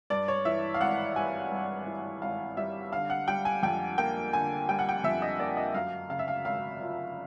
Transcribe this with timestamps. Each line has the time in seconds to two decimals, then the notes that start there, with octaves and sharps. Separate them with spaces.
0.10 G2 D5
0.28 C#5
0.45 E3 E5
0.74 F5
0.81 G#1 F#5
1.16 G3 G#5
1.51 G2
1.86 E3
2.22 G#1 F5
2.57 G3 E5
2.92 D3 F5
3.10 F#5
3.28 G3 G5
3.45 G#5
3.63 F2 G5
3.98 A#3 G5
4.33 D3 G#5
4.69 G3 G5
4.79 F#5
4.89 G5
5.04 F2 E5
5.22 D#5
5.39 A#3 D5
5.57 D#5
5.75 F#2 F5
6.09 C#3 F5
6.19 E5
6.28 F5
6.45 G#1 F5
6.81 F3